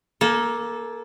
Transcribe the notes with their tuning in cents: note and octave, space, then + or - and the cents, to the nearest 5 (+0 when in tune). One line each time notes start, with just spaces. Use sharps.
A#3 +15 A4 -15